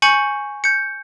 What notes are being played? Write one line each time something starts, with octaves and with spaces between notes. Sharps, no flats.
G#5 C#6 G6 C#7 F#7
G6 C#7